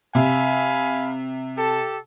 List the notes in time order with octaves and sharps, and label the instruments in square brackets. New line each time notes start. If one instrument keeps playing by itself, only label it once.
[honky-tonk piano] C3 [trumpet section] F5 G#5 B5
[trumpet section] G4 A4